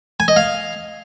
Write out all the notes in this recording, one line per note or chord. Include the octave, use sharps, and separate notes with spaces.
G#5
D#5
F5